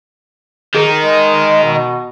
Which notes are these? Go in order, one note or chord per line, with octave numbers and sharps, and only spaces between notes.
D#3 D#4 G#4
G#3
B2